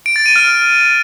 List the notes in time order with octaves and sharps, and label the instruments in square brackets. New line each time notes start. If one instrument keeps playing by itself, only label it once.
[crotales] D7
A6
D#7
F6